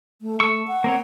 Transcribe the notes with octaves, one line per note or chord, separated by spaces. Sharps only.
A3
A3 C#6 E6
F#5
A#3 C4 C#5